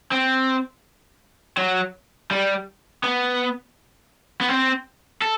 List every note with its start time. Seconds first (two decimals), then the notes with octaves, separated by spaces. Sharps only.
0.12 C4
1.57 F#3
2.31 G3
3.03 B3
4.41 B3
4.49 C4
5.22 A4